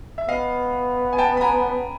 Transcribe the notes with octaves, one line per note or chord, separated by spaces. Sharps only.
E5
B3 D#5 F5
G#5
G5 A5
B5
G#5 A#5